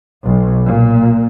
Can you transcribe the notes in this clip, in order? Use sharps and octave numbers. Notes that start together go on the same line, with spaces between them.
B1
A#2